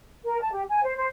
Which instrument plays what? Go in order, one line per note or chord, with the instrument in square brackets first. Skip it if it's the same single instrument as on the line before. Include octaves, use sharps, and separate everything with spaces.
[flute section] A#4
A5
G4
G#5
C5
C5